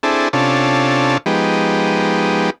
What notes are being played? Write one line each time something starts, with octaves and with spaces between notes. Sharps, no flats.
C4 D4 E4 G#4 A4
C3 C#4 D4 F4 A4
F3 G#3 B3 D#4 G4